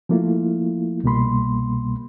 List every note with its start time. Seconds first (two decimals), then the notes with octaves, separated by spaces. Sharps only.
0.09 F3 A3 A#3 E4 F4
1.04 C2 B2 G3 A#3 B5 C6